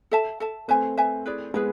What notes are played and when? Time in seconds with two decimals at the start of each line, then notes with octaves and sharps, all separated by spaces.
0.11 A4 E5 A5
0.40 A4 E5 A5
0.68 A3 C4 B4 E5 G#5
0.97 B4 E5 G#5
1.26 E4 G#4 B4 D5
1.54 G#3 B3 E4 G#4 B4